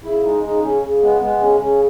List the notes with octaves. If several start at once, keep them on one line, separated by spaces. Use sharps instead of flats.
C#3 E4
G#3 D#4
C#3 D#4
C#3 C#4
C#3
G#3 B3
G#3 B3
C#3 C#4
C#3 C#4